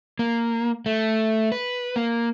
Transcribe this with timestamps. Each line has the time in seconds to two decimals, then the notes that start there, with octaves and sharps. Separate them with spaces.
0.19 A#3
0.86 A3
1.52 B4
1.96 A#3